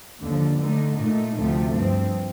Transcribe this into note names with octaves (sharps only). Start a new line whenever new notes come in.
D#2 D3 F3
D3 A3 D#4
A#2 A3 D#4
D2 C3 F3 A3
G2 F3 C4